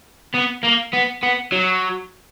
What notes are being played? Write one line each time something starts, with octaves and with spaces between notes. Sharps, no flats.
B3
A#3
B3
B3
F#3